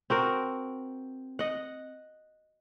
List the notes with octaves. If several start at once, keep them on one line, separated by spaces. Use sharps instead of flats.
C4 F#4 A#4
D#5 F#5